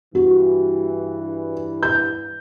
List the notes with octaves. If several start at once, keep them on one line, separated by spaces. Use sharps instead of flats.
G2 E3 F#4
G6